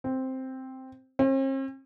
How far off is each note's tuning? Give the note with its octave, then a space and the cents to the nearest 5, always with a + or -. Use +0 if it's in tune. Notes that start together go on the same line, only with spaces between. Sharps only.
C4 +0
C4 +45